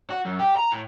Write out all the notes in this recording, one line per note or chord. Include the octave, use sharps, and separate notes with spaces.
F#4
F#2
G4
A#5
A2